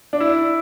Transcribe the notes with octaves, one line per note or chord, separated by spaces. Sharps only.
D4
E4